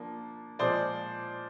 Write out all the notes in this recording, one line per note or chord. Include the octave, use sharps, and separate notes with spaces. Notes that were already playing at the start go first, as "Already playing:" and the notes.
Already playing: F3 A#3 D4
A#2 F3 G#3 C5 D5